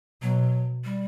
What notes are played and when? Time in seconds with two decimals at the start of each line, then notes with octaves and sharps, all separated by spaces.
0.22 B2 F#3
0.85 G3